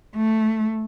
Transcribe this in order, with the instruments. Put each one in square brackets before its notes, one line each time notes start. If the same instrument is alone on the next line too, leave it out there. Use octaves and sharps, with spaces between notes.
[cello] A3